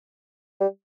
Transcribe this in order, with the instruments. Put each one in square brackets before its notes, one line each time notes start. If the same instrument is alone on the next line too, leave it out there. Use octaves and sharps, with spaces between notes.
[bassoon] G3